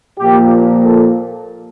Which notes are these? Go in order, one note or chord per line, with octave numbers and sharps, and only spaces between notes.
A#2 F3 A#3 G4
A4